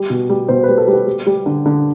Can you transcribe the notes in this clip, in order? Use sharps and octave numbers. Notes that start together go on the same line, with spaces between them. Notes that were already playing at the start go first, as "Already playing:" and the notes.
Already playing: G3
B2
G3
B2 C5
B4
G3
A4
G3
G4
G3
G3
D3
D3